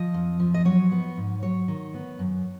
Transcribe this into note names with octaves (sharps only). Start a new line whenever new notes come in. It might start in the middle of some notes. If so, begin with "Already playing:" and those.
Already playing: F3 D#5
F2
F3
D#5
F#3 C#5
B3
G#2
F#3 C#5
D#3
B3
F#2